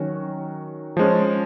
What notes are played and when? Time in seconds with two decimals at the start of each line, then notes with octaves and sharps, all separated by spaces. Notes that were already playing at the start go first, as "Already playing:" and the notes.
Already playing: D#3 F#3 C#4 F#4
0.97 F3 G#3 C#4